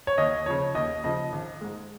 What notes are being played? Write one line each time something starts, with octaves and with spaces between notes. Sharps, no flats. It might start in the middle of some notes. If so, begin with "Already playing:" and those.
C#5
D#2 D#5
C#3 F3 C#5
D#2 D#5
C#3 F3 D#5
G#1
G#2 G#3